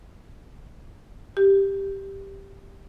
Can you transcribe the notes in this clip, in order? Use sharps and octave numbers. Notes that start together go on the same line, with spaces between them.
G4